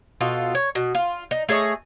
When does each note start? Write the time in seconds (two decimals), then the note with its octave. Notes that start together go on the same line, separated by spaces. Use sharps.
0.21 B2 F4 A4
0.55 C#5
0.75 B2
0.95 F4
1.31 D#4
1.49 A3 G#4 C#5 D#5